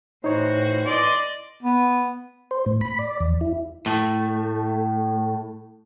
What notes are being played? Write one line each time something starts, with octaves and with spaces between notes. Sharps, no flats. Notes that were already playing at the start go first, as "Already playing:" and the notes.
A2 E3 D#4 F#4 C5 C#5
B2 E3 C#4 D5 D#5 C6
B3
C5
A2
B5
D5
E2
E4
A2 A3